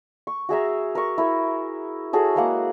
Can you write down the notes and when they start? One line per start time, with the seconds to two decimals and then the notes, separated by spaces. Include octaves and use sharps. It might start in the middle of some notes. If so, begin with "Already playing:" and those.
0.27 C#6
0.49 F#4 G#4 E5 A#5
0.95 A#4 C#6
1.18 E4 A#4 E5
2.13 F#4 G#4 A4 C#5
2.36 G#3 A#3 F#5